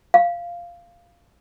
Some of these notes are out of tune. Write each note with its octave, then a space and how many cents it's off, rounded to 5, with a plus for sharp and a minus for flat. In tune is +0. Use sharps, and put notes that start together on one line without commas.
F5 -10